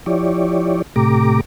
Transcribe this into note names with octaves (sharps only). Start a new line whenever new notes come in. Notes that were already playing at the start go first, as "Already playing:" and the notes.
F3 E4 G4 C#5 D5
A2 C3 A3 G4 A#5 D6